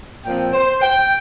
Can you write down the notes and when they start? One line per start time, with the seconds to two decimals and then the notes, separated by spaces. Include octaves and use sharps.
0.24 A#2 F3 C4 G5
0.53 C5
0.82 G5